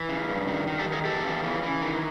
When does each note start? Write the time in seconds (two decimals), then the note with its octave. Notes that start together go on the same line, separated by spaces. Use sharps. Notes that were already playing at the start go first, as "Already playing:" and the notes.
Already playing: E3
0.09 C#3
0.29 G2
0.47 D#3
0.67 D#3
0.79 G4 A4
0.86 D#3
0.92 G#4 A#4
1.05 E2 G4 A4
1.24 C#3
1.44 E3
1.63 E3
1.82 D#3